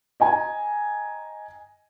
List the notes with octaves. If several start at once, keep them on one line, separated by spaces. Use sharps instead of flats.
D#5 G5 G#5 A#5